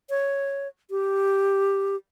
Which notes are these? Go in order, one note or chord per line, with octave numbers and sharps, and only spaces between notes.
C#5
G4